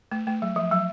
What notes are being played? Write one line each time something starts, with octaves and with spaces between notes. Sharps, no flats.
A3
A3
F#3
F3
F#3